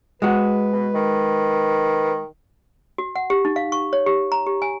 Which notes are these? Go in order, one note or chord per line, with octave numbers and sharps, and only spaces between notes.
G#3 F#4 B4
B2
D#3
F#4
F#5
G4
D#4
F5
C#6
C#5
G4
A#5
G4
G#5